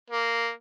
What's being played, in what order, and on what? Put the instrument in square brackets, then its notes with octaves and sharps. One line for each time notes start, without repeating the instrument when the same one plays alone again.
[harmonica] A#3